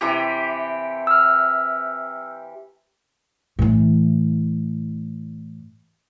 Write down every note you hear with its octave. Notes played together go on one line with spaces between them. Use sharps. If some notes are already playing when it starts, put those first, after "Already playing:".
C3 E3 G4
E6 F6
A2 E3